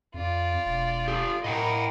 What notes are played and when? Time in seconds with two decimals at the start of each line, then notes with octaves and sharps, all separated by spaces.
0.14 F2 F4 D5
0.65 E1
1.08 G4 A4
1.44 A2 E4 A#4 D#5 F#5 G5